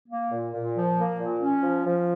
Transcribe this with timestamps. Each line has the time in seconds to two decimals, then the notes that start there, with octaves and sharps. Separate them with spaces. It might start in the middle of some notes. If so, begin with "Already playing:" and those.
0.09 A#3
0.30 A#2
0.54 A#2
0.76 F3
0.98 A#3
1.19 A#2
1.42 C#4
1.63 F3
1.86 F3